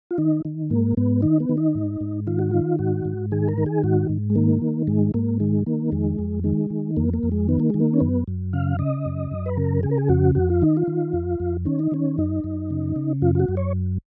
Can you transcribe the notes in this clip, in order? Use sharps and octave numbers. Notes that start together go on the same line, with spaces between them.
F4
D#3 D#4
D#3
G#2 A#3
G#2 B3
D#3 D#4
B3
D#3
D#4
G#2
G#2
D#3 F4
F#4
D#3 F4
G#2 F#4
G#2
D#3 G#4
A#4
D#3
G#4
G#2 F#4
G#2
G#3
D#3 A#3
D#3
G#2 G#3
G#2 A#3
D#3 G#3
D#3 A#3
F2 G#3
F2
D#3 G#3
D#3
F2 A#3
A#3
F2
G#3
D#3 B3
A#3
D#3 G#3
A#3
C#4
F#2 B3
F#2
C#3 F5
C#3 D#5
F#2
F#2
B4
C#3 A#4
C#3 G#4
A#4
G#4
F2 F#4
F2 F#4
F4
D#3 D#4
F4
D#3
F2
F2
D#3 C#4
D#4
D#3 C#4
F#2 D#4
F#2
C#3
C#3
F#2 F4
F4
F#4
F#2
C#5